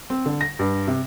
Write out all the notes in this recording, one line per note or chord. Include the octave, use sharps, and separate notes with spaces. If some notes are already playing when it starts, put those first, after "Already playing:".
C4
D3
A#6
G2
C3